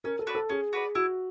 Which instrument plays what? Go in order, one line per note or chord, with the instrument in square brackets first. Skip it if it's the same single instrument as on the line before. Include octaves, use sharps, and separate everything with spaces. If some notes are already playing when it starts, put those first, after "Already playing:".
[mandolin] C#4 [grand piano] A#4
[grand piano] A4
[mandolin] F#4 B4 D5
[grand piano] A4
[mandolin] C#4 [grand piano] G#4
[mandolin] F#4 B4 D5
[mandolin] E4 [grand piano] F#4